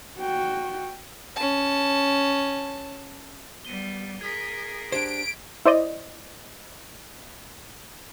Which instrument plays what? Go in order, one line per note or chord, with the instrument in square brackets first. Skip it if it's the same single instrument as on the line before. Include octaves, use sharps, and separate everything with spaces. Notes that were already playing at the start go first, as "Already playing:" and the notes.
[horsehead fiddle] F#4 G5
[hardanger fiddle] C#4 A5
[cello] G3 B3 [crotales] D#7 G7
[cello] G#4 A#4 [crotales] G#6 B6
[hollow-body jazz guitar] D4 G4 C5 [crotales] G#6 [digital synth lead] D7
[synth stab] E4 C5 D5 D#5